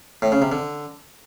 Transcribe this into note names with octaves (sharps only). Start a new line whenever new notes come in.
A2
C#3
C3
D3